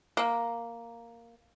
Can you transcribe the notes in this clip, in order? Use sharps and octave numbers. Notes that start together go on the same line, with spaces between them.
A#3